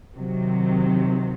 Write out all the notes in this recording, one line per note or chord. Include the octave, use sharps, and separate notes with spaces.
C3 D#3 F#3